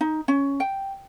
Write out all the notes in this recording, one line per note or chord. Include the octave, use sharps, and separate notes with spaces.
D#4
C#4
G5